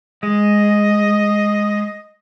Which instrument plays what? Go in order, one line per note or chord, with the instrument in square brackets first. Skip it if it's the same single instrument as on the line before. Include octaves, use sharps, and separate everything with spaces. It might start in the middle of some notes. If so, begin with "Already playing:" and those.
[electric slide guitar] G#3 [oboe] D#5